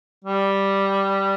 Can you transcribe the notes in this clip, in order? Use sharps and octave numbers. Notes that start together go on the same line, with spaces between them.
G3